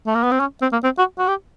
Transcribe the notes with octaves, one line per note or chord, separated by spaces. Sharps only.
A3
A#3
B3
C4
C#4
C4
A#3
C4
F#4
F#4
G4